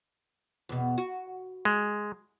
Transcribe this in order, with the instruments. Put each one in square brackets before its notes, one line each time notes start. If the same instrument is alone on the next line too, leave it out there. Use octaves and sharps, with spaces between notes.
[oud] E2 B2
F#4
[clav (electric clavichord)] G#3